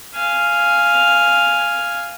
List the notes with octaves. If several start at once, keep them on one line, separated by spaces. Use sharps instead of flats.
F5 G#5